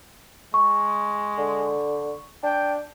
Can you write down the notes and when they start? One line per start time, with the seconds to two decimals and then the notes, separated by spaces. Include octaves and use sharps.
0.54 G#3 C#6
1.38 D3
2.43 D4 G5